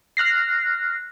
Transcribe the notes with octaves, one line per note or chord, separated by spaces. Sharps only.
F6 F#6 A#6 C7